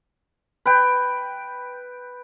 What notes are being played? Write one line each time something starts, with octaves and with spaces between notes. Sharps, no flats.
B4 G5